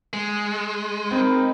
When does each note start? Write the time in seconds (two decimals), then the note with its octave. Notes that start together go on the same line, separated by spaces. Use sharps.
0.13 G#3
1.11 C4 D#4 A#4 B5